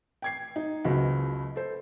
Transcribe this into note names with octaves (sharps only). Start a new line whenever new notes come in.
G5 G#6 C7
D#4
F#1 C#2 F#4
A4 C5